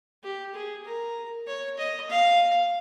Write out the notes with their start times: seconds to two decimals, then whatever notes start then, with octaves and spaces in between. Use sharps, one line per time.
0.23 G4
0.54 G#4
0.84 A#4
1.47 C#5
1.78 D#5
2.09 F5